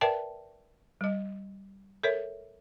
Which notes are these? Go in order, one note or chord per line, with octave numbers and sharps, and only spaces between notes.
A#4 B4 D5 E5 G5 A5
G3 D#5
A4 A#4 C#5 E5